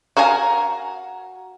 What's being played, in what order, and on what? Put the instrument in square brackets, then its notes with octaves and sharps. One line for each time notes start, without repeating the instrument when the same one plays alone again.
[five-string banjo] F#4 A#4 F5 G#5 A#5